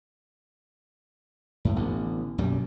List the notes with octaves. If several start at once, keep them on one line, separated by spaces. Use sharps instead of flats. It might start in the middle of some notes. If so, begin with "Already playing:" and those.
F#2 A2
A1 D3 B3
B1 F#2 A#2 G3